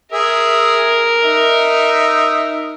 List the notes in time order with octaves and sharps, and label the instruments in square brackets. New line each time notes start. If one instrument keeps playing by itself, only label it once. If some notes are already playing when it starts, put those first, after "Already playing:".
[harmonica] G#4 E5 [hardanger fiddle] A#4
[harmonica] D#4 E5